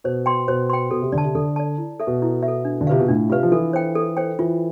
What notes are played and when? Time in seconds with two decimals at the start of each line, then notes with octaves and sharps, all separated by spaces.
0.04 B2 C5
0.26 G5 C6
0.47 B2 C5
0.70 G5 C6
0.91 B2 A4
1.02 C3
1.12 D3 D5
1.18 A5
1.24 C3
1.35 D3 A4
1.56 D5 A5
1.78 E4
2.00 A4 E5
2.07 B2
2.22 E4
2.43 E5
2.48 A4
2.65 D4
2.81 D3
2.87 C3 F4 B4 F5
2.99 B2
3.08 A2 D4
3.30 C3 F4 B4 F5
3.43 F3
3.52 E3 A4
3.73 C5 G5
3.95 A4
4.17 C5 G5
4.39 E3 F4